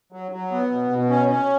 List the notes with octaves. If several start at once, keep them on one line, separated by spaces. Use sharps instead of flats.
F#3
F#3
B3
B2
B2
C#4
C#4